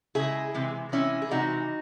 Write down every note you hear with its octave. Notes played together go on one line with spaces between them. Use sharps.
C#3 G#3 E4 G#4
C3 E3 G#3
C3 E3 G#3 C#4 E4
G#4
C3 E3 G#3 D#4 F#4